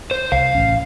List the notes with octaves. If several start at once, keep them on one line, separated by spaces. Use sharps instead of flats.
C5
C2 F5
A1 C#4